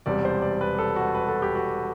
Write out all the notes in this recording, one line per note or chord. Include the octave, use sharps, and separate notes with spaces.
E1 E2 C3 G3 D5
C5
D5
B4
A4
F#4
B4
A4
G4
F#4